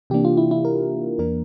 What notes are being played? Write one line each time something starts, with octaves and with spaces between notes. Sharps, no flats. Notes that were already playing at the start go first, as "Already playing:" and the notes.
C3 E3 A#3 D4 G4
F4
E4
E4
A#4
E2 E3 A#3 D4 A#4